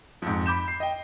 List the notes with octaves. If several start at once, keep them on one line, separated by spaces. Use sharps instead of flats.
F2 G#2
B5 D6 G6 E7
C7
D#5 G5